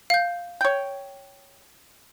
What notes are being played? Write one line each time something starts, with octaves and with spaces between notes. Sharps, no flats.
F5 G6
C#5 G5